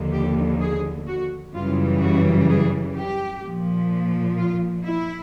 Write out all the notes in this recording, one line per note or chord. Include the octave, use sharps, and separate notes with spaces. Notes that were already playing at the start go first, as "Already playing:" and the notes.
Already playing: D#2 D3 F3
G4
G#4
F#4
F#2 C#3 E3 G3 F4
F#4
G#4
G4
A#2 F3
F4
E4